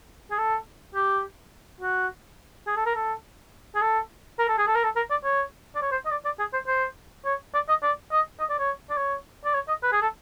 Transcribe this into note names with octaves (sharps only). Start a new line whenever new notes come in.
G#4
A4
G4
F#4
G#4
A4
A#4
A4
G#4
A4
A#4
A4
G#4
A4
A#4
A4
A#4
D5
C#5
D5
C#5
C5
D#5
D5
D5
G#4
C5
C5
C#5
D5
D#5
D5
D#5
D#5
D5
C#5
D5
C#5
D5
C#5
D#5
B4
G#4
A4